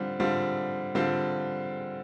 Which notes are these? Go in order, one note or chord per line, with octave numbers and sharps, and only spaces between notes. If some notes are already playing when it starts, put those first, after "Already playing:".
Already playing: D3 G3 C4 F4
D3 G3 C4 F4
D3 G3 C4 F4